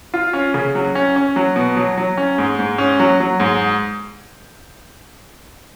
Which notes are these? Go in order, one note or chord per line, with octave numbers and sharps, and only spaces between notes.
F4
C#4
C#3
F#3
C#4
C#4
F#3
B2
F#3
F#3
C#4
G#2
G#2
C#4
F#3
F#3
G#2